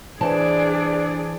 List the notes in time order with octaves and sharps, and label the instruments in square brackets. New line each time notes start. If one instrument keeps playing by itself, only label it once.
[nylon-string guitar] E3 C5 A5 [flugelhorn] D4 [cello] G#4 D5